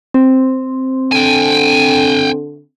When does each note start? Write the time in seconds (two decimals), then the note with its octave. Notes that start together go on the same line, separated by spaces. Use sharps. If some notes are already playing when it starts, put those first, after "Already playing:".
0.14 C4
1.12 D3 G5 G#5